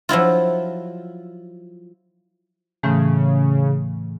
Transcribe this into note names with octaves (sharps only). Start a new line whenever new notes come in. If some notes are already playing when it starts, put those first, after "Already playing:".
F3 F#3 E4 F4
A2 C#3 E3 A3